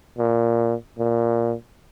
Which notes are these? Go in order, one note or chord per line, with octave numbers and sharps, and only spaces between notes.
A#2
A#2